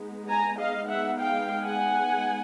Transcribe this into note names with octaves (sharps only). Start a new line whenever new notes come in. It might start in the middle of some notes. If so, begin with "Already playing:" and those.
Already playing: G#3 B3 D#4
G#5 A#5
D#5 F5
E5 F#5
F5 G5
F#5 G#5